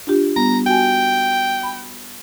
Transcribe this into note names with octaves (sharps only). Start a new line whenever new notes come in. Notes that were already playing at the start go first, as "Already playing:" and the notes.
D4 F4 G4
G3 B3 A#5
F#4 G5 G#5
B5